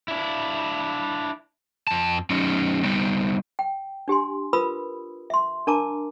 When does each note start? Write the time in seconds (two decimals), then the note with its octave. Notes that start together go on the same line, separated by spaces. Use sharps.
0.08 D4 E4
1.87 F2 A5
2.30 F#3 C#4 D#4
2.83 G3 B3 D#4
3.59 G5
4.08 D4 G4 G#5 C6
4.53 F4 A#4 B4 B5 D#6 E6
5.30 E5 C6
5.67 D4 A#4 A5 A#5 D6